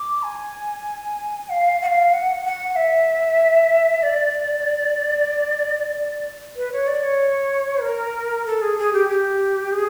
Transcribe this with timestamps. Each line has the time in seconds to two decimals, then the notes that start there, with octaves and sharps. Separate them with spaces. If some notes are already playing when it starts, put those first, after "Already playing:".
Already playing: D6
0.23 G#5
1.49 F5
1.82 F#5
1.86 F5
2.13 F#5
2.45 F#5
2.76 E5
4.03 D5
6.56 B4
6.72 C#5
6.87 D5
7.03 C#5
7.82 A#4
8.46 A4
8.62 G#4
8.78 G#4
8.93 G4
9.08 G4
9.72 G#4